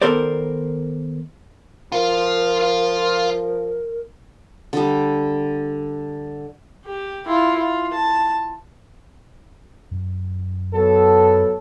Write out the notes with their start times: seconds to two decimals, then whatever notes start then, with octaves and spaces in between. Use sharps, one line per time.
0.02 D#3 B3 A4 A#4 C5 D5
1.92 F3 F4 A#4 F5
4.73 D3 G3
6.85 G4
7.26 E4 F4
7.58 F4
7.93 A5
9.91 F#2
10.73 F#3 B3 A4